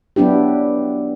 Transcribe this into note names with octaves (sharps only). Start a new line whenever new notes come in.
F#3 B3 D4 E4 G4